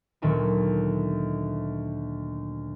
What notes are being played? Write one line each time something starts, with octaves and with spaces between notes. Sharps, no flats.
D2 A#2 D#3 F#3 B3